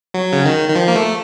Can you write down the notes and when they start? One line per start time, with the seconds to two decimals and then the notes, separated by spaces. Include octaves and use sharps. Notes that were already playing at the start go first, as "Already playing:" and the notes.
0.14 F#3
0.33 C#3
0.45 D#3
0.69 D#3
0.76 F3
0.88 A#3
0.96 A3